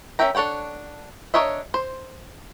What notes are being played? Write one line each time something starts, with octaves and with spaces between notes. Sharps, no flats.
C#4 A#4 E5 G5 A#5
D4 A4 C#5 F#5 G5
D4 A#4 C#5 D#5 E5
C5